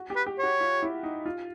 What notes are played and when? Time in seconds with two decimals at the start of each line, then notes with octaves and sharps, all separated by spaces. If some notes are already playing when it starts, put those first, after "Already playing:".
Already playing: F#4
0.10 G4
0.16 B4
0.26 G4
0.38 F#4 C#5
0.60 F4
0.83 E4
1.03 D#4
1.26 F4